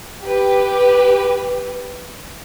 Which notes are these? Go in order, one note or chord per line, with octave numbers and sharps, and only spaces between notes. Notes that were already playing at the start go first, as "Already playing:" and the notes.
G4 B4